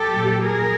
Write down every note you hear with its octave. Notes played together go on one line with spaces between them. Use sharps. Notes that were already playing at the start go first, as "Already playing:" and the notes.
Already playing: G4 A4
A#2 F#3
G#4 A#4